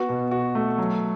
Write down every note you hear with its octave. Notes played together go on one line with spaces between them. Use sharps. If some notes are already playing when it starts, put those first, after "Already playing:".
Already playing: B3 F#4
B2
F#4
A3
F#3